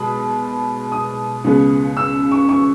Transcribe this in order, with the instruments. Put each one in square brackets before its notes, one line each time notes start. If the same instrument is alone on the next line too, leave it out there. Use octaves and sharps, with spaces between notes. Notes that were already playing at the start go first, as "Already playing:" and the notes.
Already playing: [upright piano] B2 G#3 B5 D#6
D#6
C#2 C#3 G#3 B3
E6
C#6
C#6